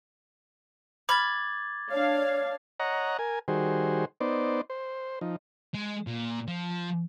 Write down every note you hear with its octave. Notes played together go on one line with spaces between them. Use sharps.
B5 D6 F6 G#6 A6
D4 C#5 F5
C#5 D#5 F#5 A#5
A#4 G#5
D#3 G3 F#4 G#4 C5
B3 D#4 C5 D5
C5
F3 D#4
G#3
A#2
F3